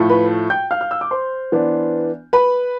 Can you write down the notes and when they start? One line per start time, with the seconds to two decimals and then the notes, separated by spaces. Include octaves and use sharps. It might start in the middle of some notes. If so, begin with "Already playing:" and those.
Already playing: A2 F3 A3
0.09 B4 B5
0.50 G5 G6
0.71 F5 F6
0.81 F6
0.91 E6
1.01 D6
1.11 C5 C6
1.52 E3 B3 D4
2.33 B4 B5